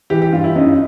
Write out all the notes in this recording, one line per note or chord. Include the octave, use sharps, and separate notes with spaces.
E3 G4
G4
G2 F4
E4
F#2 D#4